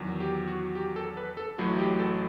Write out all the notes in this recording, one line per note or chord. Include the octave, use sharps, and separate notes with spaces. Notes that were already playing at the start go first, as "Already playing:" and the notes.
Already playing: E2 D#3 F#3
G4
F#4
G4
A4
B4
A4
A1 A2 F#3 F#4
G4
A4